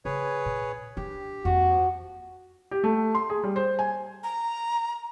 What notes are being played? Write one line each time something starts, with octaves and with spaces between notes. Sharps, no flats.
C#3 G#4 B4 C#5
A#2
D4 G4
F2 A#3 F#4
F3
G4
A3
C6
G#4
G3
C5
G#5
A#5